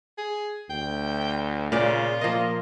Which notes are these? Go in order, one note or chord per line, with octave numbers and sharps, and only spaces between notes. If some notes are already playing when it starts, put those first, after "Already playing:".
G#4
D2 G5
A#2 C#3 F4 D5
F3 A#3 D#5